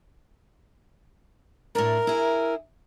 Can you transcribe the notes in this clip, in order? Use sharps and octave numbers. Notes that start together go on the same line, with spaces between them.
A2 D4 A#4
E4 G#4